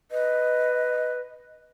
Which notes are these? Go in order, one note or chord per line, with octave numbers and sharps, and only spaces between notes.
B4 D#5